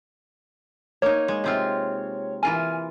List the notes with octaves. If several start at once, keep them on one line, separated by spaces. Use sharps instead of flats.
A#3 D#4 C#5
G#3
C3 C4 F4
E3 F4 A#4 G#5